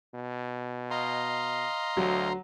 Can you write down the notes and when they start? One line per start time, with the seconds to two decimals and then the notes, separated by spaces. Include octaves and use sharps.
0.15 B2
0.91 D#5 F5 A#5 C6
1.97 D2 F#3